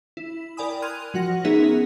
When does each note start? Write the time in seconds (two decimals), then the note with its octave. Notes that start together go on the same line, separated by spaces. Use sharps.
0.17 E4
0.57 A#4 D5 G5 G#5 B5 D#6
0.82 C6 F6 F#6 G#6 D#7 F7
1.14 F3 F#4 F#5 A#6
1.44 B3 C#4 D#4 G#4 A#4 E5